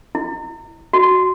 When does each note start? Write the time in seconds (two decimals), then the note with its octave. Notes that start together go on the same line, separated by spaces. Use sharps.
0.15 E4
0.93 F#4